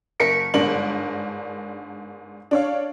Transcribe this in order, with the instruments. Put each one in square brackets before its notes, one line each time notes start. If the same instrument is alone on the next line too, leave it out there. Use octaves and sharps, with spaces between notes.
[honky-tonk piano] F#1 A#4 B6 C#7 D7
G1 G#2 D4 A#4 F#7
D4 C#5 F5